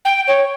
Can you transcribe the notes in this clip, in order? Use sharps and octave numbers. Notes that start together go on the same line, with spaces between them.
G5
C#5